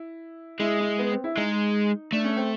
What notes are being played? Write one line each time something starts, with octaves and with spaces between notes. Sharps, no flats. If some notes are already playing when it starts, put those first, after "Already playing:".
Already playing: E4
G#3 E4
E4
B3
C4
E4
G#3 D#4
A3 D4
C#4
C4